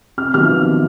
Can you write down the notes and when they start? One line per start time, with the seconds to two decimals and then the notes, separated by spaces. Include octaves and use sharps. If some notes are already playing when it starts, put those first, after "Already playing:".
0.17 C3 F6
0.34 D#3 F#3 B3 F6